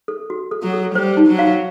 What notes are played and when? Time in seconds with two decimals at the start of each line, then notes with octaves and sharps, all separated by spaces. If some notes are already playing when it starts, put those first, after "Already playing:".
0.08 A4
0.30 F#4
0.51 A4
0.63 F#3
0.73 A4
0.95 G3 C5
1.17 D#4
1.28 F#3
1.39 F5